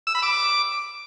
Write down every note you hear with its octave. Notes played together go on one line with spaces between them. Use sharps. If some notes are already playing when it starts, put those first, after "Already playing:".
E6
B5
D6